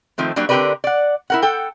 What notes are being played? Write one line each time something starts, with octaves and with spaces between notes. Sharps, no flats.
D#3 F3 A3 C4
F#3 G3 A#3 D4
D3 C4 G4 A#4 B4 D5
D5 F#5
E4 A#4 F#5
A4 F#5 G5